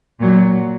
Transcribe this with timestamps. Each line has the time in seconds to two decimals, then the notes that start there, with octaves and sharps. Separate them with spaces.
0.19 A#2 F#3